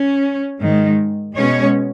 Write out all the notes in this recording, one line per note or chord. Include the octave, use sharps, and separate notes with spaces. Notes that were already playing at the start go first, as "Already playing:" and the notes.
Already playing: C#4
G#2 D#3 G#3
B2 G#3 C#4 C#5